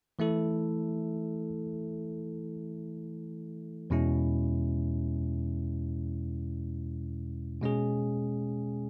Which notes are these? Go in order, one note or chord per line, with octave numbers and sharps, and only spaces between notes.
E3 A3 E4 A4
E2 B2 G#3 C#4 E4
B2 G#3 C#4 G#4